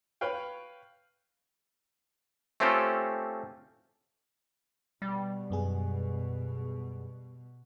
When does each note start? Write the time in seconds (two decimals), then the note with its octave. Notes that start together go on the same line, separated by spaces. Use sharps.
0.21 B4 C#5 F5 G5
2.60 A3 C4 C#4 F4 G4 A4
5.02 B2 G3
5.50 F#2 B3 G#4